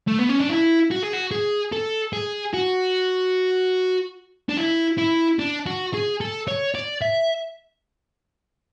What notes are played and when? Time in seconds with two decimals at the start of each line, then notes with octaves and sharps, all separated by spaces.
0.08 A3
0.19 B3
0.29 C#4
0.40 D4
0.50 E4
0.91 F#4
1.03 G#4
1.13 F#4
1.32 G#4
1.72 A4
2.13 G#4
2.54 F#4
4.49 D4
4.58 E4
4.98 E4
5.39 D4
5.66 F#4
5.94 G#4
6.21 A4
6.48 C#5
6.75 D5
7.02 E5